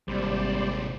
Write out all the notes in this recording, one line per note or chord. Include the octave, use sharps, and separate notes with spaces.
G#1 G#2 C3 G3 C5 D5